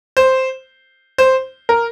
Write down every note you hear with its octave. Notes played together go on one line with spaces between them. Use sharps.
C5
C5
A#4